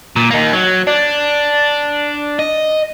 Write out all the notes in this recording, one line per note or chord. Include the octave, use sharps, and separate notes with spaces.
A#2
A#3 D#4
F#3
D4
D#5